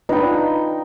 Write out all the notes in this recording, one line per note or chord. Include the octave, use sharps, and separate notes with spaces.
D4 D#4 F4 B4 G5